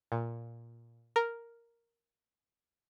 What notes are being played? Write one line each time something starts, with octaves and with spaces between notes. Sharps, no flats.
A#2
A#4